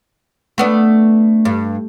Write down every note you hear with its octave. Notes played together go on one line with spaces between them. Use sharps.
A3 B3 D4
G2